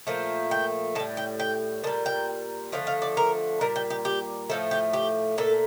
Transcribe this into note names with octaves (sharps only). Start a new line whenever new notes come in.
A#2 F3 A3
G5
A2 G3 A5
G5
G5
A#2 G3 A5
G5
D3 F3 A3 F5
F5
D5
A#4
A#2 G3 A#4
G4
G4
G4
A2 F3 A3 A4
G4
G4
A#2 A3 A4